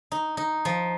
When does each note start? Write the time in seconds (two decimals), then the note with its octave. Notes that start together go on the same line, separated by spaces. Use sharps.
0.12 D#4
0.37 D#4
0.65 F3